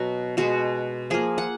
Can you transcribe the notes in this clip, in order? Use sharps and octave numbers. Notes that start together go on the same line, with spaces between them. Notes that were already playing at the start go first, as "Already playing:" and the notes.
Already playing: B2 F#3 B3 F#4
B2 G#3 B3 F#4
F3 A#3 G#4
F#5